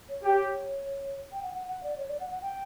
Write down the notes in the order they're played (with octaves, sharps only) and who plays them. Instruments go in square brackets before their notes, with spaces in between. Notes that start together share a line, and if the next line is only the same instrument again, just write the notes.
[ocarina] C#5
[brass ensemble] G4
[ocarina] G5
F#5
F#5
F#5
D5
C#5
D5
F#5
F#5
G5